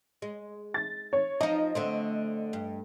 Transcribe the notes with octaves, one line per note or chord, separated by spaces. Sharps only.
G#3
A6
C#5
F3 D#4 D#5
D3 A3 C4
G2